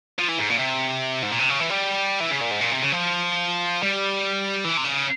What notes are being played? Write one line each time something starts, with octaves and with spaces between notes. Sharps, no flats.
F3
E3
G#2
A#2
C3
G#2
A#2
C3
C#3
E3
G3
E3
C#3
A#2
G#2
A#2
C3
C#3
F3
G3
E3
C3
C#3